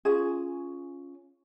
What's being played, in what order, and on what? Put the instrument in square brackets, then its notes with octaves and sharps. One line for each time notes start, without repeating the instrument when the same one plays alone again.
[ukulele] C#4 F4 G#4